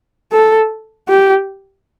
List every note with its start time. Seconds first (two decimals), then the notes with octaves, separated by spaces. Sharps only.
0.33 A4
1.09 G4